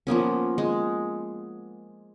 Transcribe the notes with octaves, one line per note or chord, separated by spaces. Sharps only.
F3 A#3 B3 C#4
G#3